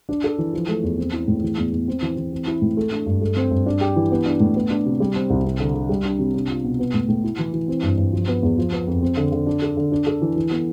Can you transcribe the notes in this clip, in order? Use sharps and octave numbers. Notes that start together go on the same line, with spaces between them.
D4
A4
E3
F3
A3
E2
C4
E4
A2
E3
E2
E2
C4
E3
E3
C4
E4
A2
A3
D4
G2
A3
C4
G2
D4
G4
E3
B3
D4
A2
B3
D4
C3
G3
C4
C2
C4
D3
D3
G3
D4
C3
D4
F4
B2
B3
A2
A2
E4
E3
E3
C4
G2
G2
F3
B3
E2
F3
B3
F2
C4
D3
D3
D4
A4
D3
D4
A4
E3
E3
B3